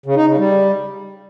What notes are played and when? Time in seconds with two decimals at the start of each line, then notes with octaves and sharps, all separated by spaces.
0.06 C#3
0.17 D#4
0.27 C#3
0.38 G3